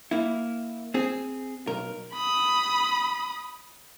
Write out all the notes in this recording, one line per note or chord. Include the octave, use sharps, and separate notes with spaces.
A#3 E4
C4 G#4
B1 A#4
B5 D#6